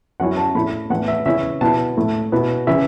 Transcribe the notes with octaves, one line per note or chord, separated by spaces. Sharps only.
F#2 F#3 C#4 E4 F#5
A5
A2 A3 E4 B5
A2 E3 B3 F#5
E5
C#3 E3 C#4 E4 E5
B2 B3 E4 A5
A2 A3 E4
B2 B3 E4
C#3 E3 E5